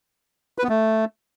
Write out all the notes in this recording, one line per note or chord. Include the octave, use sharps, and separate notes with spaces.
B4
B3
A3